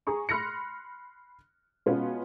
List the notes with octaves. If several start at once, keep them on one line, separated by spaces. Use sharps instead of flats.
G#4 A#5 C#6
B5 C6 F6 F#6 A#6 C#7
B2 G#3 B3 C#4 F4